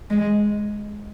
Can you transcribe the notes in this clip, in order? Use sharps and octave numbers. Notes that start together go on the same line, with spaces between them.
G#3